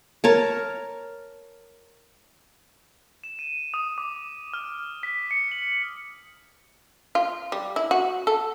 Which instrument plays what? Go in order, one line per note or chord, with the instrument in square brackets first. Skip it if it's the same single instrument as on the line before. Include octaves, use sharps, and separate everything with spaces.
[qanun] A#4 C#5 A5
[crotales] E7
D#7
D#6
D6
F6
B6
C#7
F#7
[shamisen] F4
G3
E4
F#4
A4